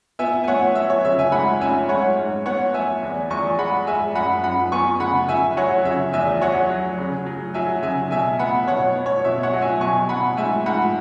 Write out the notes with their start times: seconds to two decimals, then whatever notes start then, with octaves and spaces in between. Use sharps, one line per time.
0.19 B3 E5 G#5
0.44 G#5
0.48 B3 C#5 F#5
0.75 F#3 E5
0.90 C#5
1.05 C#3 E5
1.19 E5 G#5
1.32 G#2 F#5 B5
1.60 C#4 E5 G#5
1.89 G#2 C#5 F#5
2.17 G#2
2.46 B3 C#5 F#5
2.74 B3 E5 G#5
3.03 E2
3.30 E2 G#5 C#6
3.58 G#3 F#5 B5
3.87 G#3 E5 G#5
4.15 F#2 F#5 B5
4.43 F#2 F#5 B5
4.72 B3 G#5 C#6
5.00 C#3 F#5 B5
5.29 C#3 E5 G#5
5.57 F#3 C#5 F#5
5.85 C#3 E5
6.13 E2 E5 G#5
6.42 F#3 C#5 F#5
6.70 F#3
6.99 C#3
7.26 F#3
7.54 F#3 E5 G#5
7.83 C#3 E5 G#5
8.11 B2 E5 G#5
8.39 B3 F#5 B5
8.67 B2 C#5 F#5
8.96 B3
9.06 C#5
9.24 B2 E5
9.43 C#5 F#5
9.53 F#3
9.62 E5 G#5
9.81 B2 G#5 C#6
10.09 B2 F#5 B5
10.37 G#2 E5 G#5
10.66 G#2 F#5 B5